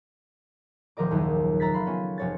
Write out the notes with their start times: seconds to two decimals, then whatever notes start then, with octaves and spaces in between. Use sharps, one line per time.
0.97 D#1 F3 A#4 D#5 D6
1.11 F#1 D#2
1.60 E5 A#5 F#6 A6 B6
1.74 A3 F5 B5 C6
1.86 B3 C#4 F4
2.18 F1 C#5 A6